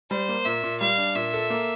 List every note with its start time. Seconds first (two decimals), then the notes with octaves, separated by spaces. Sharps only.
0.10 G3 C5
0.29 A#3
0.45 A#2 E5
0.63 A#2
0.81 G3 F5
0.98 D4
1.15 A#2 E5
1.34 A4
1.50 A#3